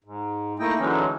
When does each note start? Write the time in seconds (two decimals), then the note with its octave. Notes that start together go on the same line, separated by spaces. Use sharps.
0.04 G#2
0.59 A3 A#3 D#4 E4 D#5 G5
0.78 D3 E3 F#3 G#3 C#4 D#4